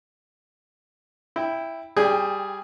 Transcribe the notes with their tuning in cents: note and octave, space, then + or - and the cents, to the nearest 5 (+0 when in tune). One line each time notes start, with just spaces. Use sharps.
E4 +0 G5 +10
G3 +0 G#4 +0 G5 +25